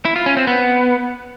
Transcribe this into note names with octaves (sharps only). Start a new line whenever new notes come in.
E4
F4
C#4
C4
B3